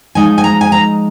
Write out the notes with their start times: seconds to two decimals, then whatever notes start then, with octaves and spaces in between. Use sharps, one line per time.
0.15 F3 G#3 D#4 G#5
0.38 G#5
0.44 A#5
0.61 G#5
0.72 A#5